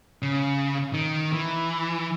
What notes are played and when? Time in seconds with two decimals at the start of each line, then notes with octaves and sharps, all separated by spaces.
0.22 C#3
0.94 D#3
1.33 E3